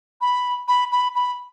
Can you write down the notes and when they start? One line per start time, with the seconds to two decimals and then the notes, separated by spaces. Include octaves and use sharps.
0.21 B5
0.68 B5
0.92 B5
1.15 B5